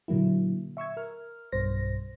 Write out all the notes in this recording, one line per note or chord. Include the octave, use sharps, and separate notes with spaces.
A#2 D3 F#3 A#3 E4
E5 C#6 E6 G#6
A#4 F6
B1 G2 B2 C5 A#6